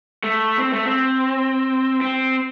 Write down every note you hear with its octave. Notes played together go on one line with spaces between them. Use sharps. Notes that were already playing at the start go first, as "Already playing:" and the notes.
A3
C4
A3
C4
C4